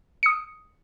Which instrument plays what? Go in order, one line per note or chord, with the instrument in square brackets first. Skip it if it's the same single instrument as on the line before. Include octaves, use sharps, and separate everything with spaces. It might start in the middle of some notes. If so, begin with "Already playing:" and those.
[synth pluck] D#6 C#7